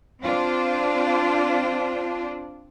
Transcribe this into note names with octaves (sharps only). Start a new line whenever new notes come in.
C4 D4 F4 C5